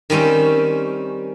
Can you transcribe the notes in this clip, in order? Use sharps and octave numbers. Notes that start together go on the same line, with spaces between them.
D#3 G3 C4 C#4